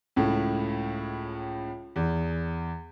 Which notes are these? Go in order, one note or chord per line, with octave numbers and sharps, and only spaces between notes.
C#2 A2
E2